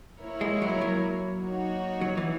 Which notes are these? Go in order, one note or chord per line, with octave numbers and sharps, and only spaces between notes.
A#3 E4 A#4 C#5
G#3
F#3
F#3
A#3 D#4 F#4 C#5
F#3
E3